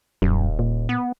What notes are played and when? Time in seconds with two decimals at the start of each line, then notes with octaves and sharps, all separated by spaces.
0.22 D#1 F#2
0.59 A#2
0.89 B3